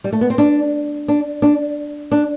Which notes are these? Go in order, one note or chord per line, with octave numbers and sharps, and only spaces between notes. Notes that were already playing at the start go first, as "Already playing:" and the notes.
G3
A3
B3
C4
D4
D4
D4
D4